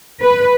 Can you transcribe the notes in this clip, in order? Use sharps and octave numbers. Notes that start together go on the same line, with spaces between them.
B4